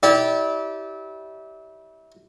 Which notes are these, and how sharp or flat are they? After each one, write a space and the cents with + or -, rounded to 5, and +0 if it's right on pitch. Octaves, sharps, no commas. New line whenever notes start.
E4 -30 G4 -15 D5 -15